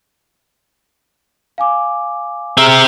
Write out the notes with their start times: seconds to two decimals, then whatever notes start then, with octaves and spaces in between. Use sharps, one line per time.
1.58 F5 G#5 D6
2.57 C4 G#4 E5 A#5 F6